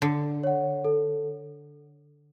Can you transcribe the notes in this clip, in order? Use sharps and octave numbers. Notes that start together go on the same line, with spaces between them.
D3 A4
C#5 F#5
A4